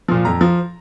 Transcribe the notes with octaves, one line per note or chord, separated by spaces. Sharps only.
A#2 F3
F2 A#5
F3